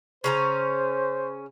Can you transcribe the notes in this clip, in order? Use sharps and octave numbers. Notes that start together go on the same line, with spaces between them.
C#3 C#4 C5 A#5